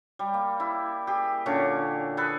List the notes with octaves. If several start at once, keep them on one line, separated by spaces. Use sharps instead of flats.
G3
A#3
E4
G4 G#4
A#2 D3 C#4
G#4 A4 B4 G#5